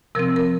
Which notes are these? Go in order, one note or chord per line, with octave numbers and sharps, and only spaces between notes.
C3 F3 C4 A#4
A#4